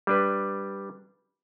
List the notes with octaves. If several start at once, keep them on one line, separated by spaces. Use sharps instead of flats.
G3 D4 B4